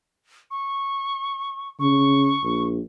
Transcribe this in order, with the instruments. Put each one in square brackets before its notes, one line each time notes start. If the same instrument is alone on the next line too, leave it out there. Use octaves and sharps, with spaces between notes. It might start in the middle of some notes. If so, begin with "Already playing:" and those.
[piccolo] C#6
[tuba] C#3 [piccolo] C#6
[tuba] A#1